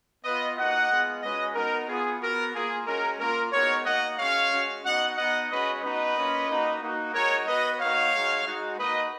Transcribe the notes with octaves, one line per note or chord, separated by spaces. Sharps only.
B3 F4 B4 D#5
A#3 D#4 F#4 D#5 F#5
G#3 B3 F4
G#3 C#4 F#4 B4 D#5
B3 D#4 F#4 A#4
B3 F4 G#4
B3 F#4 A#4
A#3 F4 G#4
G#3 C#4 F#4 A#4
A#3 F4 A#4
G#3 B3 D#4 F#4 A#4 C#5
A#3 D#4 F#4 D#5 F#5
G#3 C#4 F#4 C#5 F5
G#3 C#4 F#4
B3 D#4 F#4 D#5 F#5
B3 D#4 F#4 D#5 F#5
G#3 C#4 F#4 B4 D#5
B3 D#4 F#4 B4 D#5
A#3 C#4 F4
A#3 D#4 F#4
A#3 D#4 F#4
G#3 D#4 F#4 A#4 C#5
B3 F#4 B4 D#5
A#3 D#4 F#4 C#5 F5
G#3 D#4 F#4
G#3 D#4 F#4
A#3 D#4 F#4 B4 D#5